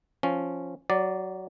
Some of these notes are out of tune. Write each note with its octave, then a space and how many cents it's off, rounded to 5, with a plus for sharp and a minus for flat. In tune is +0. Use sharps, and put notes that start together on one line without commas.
F3 +0 C#4 +0
F#3 +15 D5 -5